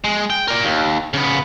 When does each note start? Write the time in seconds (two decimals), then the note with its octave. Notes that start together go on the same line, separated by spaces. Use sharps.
0.04 G#3
0.30 G5
0.48 A#4 D5
0.64 D#2
1.14 C#3 B3